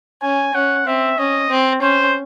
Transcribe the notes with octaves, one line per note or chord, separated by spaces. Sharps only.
C#4 G#5
C#4 F#5
C4 E5
C#4 D#5
C4
C#4 C5